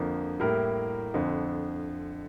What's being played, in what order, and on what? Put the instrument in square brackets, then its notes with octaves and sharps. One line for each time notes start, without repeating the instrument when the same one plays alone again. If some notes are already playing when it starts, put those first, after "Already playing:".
Already playing: [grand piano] F2 D3 F3 A#3
A2 G3 A#3 E4 A#4
F2 D3 F3